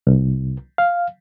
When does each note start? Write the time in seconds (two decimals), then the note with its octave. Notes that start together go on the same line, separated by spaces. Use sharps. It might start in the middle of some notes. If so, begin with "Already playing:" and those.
0.07 C2
0.78 F5